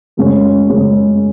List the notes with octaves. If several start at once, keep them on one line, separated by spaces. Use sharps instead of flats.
F#2 C#3 G#3 C#4
F#2 C#3 G#3 C#4